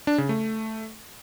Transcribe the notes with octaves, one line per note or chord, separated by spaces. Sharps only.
D4
C#3
A3